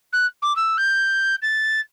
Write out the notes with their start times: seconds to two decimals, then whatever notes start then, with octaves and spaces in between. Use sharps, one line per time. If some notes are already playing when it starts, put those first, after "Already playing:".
0.12 F#6
0.42 D6
0.55 E6
0.77 G6
1.42 A6